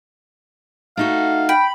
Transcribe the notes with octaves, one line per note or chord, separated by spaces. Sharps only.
A3 D#4 F#4 F5
G5 B5